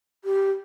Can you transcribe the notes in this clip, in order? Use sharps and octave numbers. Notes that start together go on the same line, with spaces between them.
G4